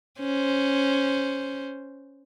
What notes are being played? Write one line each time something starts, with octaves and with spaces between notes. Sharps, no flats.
C#4 C5